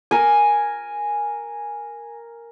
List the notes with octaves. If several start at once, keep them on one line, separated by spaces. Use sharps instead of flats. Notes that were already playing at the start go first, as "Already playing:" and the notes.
A#4 G#5